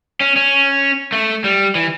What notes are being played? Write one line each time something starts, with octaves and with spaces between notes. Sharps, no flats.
C#4
C#4
A3
G3
E3